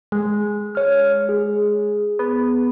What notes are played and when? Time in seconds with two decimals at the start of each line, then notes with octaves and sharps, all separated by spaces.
0.12 G#3
0.75 C#5 F6
1.29 G#4
2.19 B3